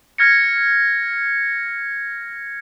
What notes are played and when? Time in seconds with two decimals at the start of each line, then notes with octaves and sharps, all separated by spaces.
0.18 F6 G#6 A#6 C#7